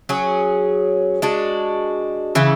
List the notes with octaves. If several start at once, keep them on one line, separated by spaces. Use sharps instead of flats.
F#3 C#4 G#4
G#3 D4 F#4
C#3 E3 B3